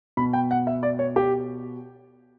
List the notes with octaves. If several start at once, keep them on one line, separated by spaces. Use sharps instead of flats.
B2 B5
G5
F#5
E5
D5
C#5
G4